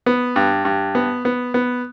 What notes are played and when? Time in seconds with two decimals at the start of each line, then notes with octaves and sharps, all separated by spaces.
0.06 B3
0.36 G2
0.65 G2
0.95 B3
1.25 B3
1.54 B3